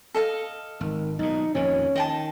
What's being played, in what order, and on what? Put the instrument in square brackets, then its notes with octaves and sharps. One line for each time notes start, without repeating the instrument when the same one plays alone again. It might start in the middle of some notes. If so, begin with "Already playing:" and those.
[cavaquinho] A4 D#5 F5
[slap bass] G#1 [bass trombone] D#3
[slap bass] B1 A#2 [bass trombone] D#4
[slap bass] F2 A#2 D#3 [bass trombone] C#4
[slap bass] D#3 [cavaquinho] D#5 G5 A5